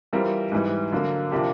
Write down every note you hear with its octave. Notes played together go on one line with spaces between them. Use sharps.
E3 G3 C4 F4 A#4
G#2 E3 G3
D3 F#3 A#3
C3 F3 A#3 D4 G4